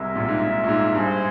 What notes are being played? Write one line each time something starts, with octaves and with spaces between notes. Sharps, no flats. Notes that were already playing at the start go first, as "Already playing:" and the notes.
Already playing: C2 C3 G#3 E4 A#4 E5
A#1 A#2
G#2
G#2
A#2
G#2
G2 G#3 E4 G#4 C5